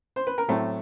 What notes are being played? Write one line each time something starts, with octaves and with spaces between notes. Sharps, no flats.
C5
B4
A#4
A2 F#3 A3 C4 A4